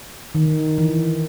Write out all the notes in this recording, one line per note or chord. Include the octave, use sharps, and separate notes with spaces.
D#3
E3